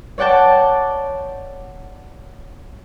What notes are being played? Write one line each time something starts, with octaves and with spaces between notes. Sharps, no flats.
C#5 D5 F#5 G5 A5